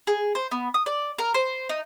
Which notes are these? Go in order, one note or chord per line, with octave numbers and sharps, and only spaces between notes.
G#4
C5
B3
D#6
D5
A#4
C5
D#4